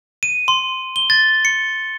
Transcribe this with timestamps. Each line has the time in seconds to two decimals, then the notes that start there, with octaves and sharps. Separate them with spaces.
0.23 D#7
0.48 C6
0.96 G7
1.10 A6
1.45 C#7